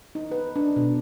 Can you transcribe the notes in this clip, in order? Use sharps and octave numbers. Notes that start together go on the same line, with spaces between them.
D#4
B4
D4
B2